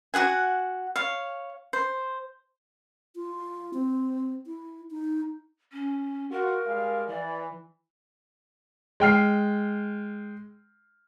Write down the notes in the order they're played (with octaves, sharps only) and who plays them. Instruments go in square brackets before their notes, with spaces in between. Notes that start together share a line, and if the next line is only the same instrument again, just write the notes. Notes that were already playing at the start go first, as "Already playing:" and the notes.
[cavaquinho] F#4 G#4 F#5 G#5
C#5 F5
C5
[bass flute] F4
C4
E4
D#4
[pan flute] C#4
[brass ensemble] F4 F#4 [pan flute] A#4
[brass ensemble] G3 G#3 F5
[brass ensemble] E3 [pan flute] D5
[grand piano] G#3 G5 F6 C7